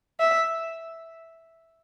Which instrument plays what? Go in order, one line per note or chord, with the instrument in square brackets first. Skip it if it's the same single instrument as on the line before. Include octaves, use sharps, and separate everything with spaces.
[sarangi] E5